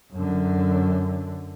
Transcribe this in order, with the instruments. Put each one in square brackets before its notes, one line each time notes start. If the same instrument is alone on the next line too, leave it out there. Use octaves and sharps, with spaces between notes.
[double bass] F#2 D3